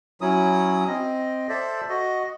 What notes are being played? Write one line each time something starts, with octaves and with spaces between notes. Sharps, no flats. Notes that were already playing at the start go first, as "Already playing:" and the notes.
F#3 C#4 E4 D#6
C4 D#5
A4 C5 D5 E5
F#4 D#5